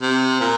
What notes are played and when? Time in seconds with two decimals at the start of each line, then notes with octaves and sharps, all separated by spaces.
0.01 C3
0.40 A#2